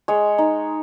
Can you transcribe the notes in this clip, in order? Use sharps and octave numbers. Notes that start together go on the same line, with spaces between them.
G#3 C#5
D#4